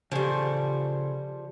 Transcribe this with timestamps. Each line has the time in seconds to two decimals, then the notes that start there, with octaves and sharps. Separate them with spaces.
0.12 C#3 F3 G3 G#4 A4